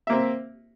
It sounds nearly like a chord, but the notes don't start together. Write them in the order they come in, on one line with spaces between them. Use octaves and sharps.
E5 A#3 C4